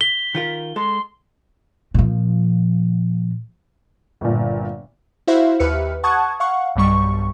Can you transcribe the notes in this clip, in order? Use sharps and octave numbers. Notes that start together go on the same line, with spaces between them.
B6 G7
D#3 F4 A#4
G#3 A4 C6
A#2 F3
G1 A#2
E4 F#4 C5 E5 F5
D#2 G4 B4 E5 F6 C#7
F#5 A5 C#6 D#6 F#6 G#6
F5 F#5 C#6
B1 G2 G3 C#6